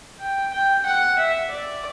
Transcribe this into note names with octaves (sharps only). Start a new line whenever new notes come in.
G5
G5
F#5
E5
D5